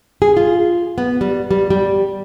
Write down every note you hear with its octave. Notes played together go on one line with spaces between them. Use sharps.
G#4
F4
B3
G3
G3
G3